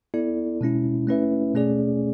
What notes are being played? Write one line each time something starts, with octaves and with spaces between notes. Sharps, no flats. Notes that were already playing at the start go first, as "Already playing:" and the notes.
B3 E4 A4 D5
B2 G#3 C#4 E4
A3 C#4 E4 B4 E5
B2 A3 C#4 G#4 D5